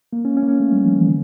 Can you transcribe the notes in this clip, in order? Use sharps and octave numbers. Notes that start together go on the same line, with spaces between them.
A#3
C#4
C#4
A#3
C#4
A3
G3
F3
E3
D3